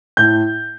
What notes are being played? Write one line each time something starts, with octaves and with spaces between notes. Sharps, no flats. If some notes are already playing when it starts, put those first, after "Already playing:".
A2 G6